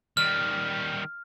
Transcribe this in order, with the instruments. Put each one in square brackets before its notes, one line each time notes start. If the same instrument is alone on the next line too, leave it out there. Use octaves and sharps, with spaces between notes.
[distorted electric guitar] D#3 G3 [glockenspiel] F6